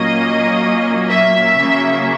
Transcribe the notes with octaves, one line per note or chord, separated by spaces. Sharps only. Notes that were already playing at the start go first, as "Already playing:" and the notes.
Already playing: A#2 F#3 A#3 C#4 D#5
E5
C#3 F#3 A#3 C#4